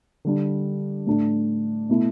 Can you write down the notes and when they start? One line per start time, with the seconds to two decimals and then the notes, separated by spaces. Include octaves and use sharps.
0.25 D3 G3 D4
1.07 A2 A3 D4
1.89 B2 A3 E4